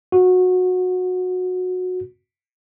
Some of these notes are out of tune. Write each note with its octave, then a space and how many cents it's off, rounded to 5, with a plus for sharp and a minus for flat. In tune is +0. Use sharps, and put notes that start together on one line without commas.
F#4 -20